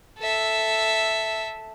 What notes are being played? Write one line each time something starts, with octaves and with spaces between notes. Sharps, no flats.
A4 E5